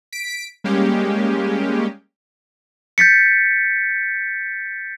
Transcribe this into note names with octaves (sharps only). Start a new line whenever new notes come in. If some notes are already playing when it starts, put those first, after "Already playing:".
B6 D7
G3 G#3 A#3 C#4 G4
G6 A6 B6 C#7